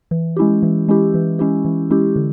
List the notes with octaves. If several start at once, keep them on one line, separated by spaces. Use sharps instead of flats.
E3
G#3 C#4 E4 G4
E3
G#3 C#4 E4 G4
E3
G#3 C#4 E4 G4
E3
G#3 C#4 E4 G4
D3